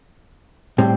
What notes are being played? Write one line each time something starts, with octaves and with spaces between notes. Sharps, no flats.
A2 G3 C4